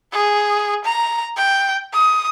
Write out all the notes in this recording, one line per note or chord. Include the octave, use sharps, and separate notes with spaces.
G#4
A#5
G5
D#6